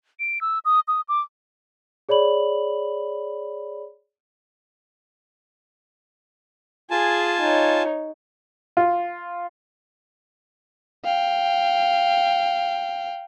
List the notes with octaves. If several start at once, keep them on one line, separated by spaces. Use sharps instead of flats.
D7
E6
D#6
D#6
D6
G#4 C#5 D5 B5 F#7
F4 G#4 G#5 A5
D#4 C#5
F4
F5 G5